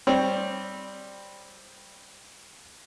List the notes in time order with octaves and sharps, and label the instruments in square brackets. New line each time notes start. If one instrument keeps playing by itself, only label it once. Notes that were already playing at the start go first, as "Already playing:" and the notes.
[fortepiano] G3 C4 [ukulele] C#5